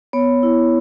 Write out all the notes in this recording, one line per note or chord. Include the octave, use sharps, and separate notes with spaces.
B3 C#5
E4